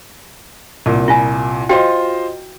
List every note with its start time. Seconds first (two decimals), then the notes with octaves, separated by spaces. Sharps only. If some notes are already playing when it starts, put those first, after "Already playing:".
0.86 C2 A#2
1.08 E4 F4 G#5
1.69 F4 F#4 C5 D#5 G5